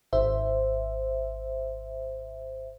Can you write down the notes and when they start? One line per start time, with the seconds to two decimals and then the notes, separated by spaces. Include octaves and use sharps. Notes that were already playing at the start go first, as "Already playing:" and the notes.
0.13 G#1 C5 E5